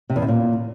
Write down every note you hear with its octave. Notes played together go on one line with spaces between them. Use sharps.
C3
E2
C3
A#2